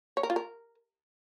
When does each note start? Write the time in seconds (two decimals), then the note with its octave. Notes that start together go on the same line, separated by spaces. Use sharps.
0.17 C#5
0.23 A#4
0.30 F4
0.36 A#4